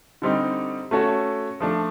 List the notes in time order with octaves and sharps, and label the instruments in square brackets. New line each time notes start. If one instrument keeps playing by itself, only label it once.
[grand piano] D3 G3 C4 D#4
A3 C#4 F#4 A4 C#5
F3 A3 D4